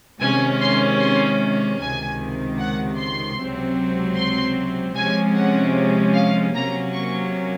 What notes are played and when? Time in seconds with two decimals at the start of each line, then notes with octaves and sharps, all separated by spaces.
0.20 C3 D#3 G#3 C#4 G#5
0.61 C6
1.00 C6
1.80 C#2 C3 D#3 G#5
2.59 F#5
2.98 C6
3.38 C#2 C3 F#3 C4
4.17 C6
4.96 C3 F3 G#3 C#4 G#5
5.37 F#5
6.16 F5
6.55 C3 F#3 A#3 C#4 A#5
6.95 C#6